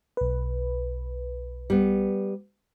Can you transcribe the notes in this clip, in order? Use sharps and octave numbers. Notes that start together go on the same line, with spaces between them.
B1 B4
G3 B3